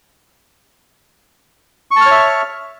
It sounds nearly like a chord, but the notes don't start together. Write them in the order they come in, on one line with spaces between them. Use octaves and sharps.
C#6 A5 F6 C#5 E5